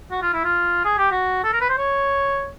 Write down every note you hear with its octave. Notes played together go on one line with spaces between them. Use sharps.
F#4
F4
E4
F4
G#4
G4
F#4
A4
A#4
B4
C5
C#5